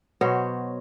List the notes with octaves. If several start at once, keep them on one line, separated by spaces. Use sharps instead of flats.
B2 F#3 C5 C#5